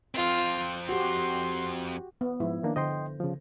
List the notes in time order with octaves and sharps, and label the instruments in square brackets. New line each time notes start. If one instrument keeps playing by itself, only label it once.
[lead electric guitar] F2 C4 [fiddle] F4 F6
[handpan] F#4 G4 [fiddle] C6
[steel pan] B3
[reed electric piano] G#2 [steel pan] F3 E4
[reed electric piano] D#3 A#3 D4
[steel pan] D3 C5 [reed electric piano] D#5 G5 C6
[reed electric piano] C#3 F3